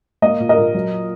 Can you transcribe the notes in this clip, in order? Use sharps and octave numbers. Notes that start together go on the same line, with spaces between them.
A#3 D#5
A#2
A#4 D#5
A#2
F#3